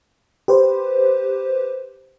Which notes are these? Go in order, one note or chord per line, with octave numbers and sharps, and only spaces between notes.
G4 B4 C5